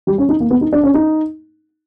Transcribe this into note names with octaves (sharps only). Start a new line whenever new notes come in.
G3
C#4
D#4
A#3
B3
D#4
D4
C#4
D#4